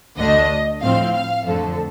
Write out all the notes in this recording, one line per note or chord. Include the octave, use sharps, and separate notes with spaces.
D2 D3 A3 D4 D#5
A2 F3 C4 F5
F5
F2 D3 F3 A3 A4